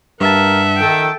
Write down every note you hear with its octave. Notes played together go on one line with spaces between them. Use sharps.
G2 A#4 E5 F#5 A5
D#3 A4 G5